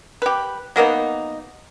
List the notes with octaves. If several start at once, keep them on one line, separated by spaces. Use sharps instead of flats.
G4 B4
F#3 A#3 B3 D#4